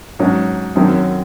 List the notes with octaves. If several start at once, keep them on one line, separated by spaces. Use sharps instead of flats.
G#2 F#3 C#4
F#2 D#3 F#3 C4